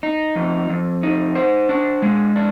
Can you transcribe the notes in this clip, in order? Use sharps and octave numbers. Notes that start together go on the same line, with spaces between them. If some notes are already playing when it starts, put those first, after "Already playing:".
D#4
F2
F2
D#4
C5
D4
G#3
D4